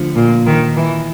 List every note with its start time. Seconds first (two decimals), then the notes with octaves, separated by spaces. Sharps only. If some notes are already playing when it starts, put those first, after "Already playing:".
Already playing: D3 F3 A3
0.16 A#2
0.46 D#3
0.76 E3